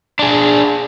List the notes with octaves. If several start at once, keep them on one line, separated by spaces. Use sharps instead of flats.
D4 G#4